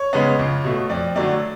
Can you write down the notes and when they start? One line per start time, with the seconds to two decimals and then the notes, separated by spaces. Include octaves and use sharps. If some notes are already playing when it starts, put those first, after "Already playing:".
Already playing: C#5
0.13 C#3 G#3 B3
0.39 C#2
0.64 B2 A3
0.90 F2 D5
1.15 D3 F#3 A3 D5